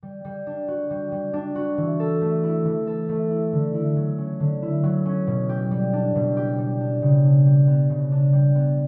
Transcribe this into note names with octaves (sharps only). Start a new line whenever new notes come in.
G3
G3
D4
F#4
G3
G3
D4
F#4
E3
A4
A3
E4
E3
A4
A3
E4
D3
E4
F#3
C#4
D3
E4
F#3
C#4
B2
G4
G3
D4
B2
G4
G3
D4
C#3
D4
G3
B3
C#3
D4
G3
B3